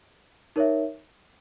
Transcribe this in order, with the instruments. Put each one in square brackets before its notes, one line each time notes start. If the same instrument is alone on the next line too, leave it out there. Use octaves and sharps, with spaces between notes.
[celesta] D#4 A#4 C#5 E5